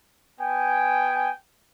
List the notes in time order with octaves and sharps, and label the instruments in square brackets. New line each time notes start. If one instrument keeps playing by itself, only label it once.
[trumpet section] B3 G5 G#5